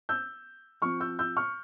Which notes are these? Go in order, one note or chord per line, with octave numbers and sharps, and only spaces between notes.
E6 G6
F3 C4 C#6 F6
E6 G6
E6 G6
C#6 F6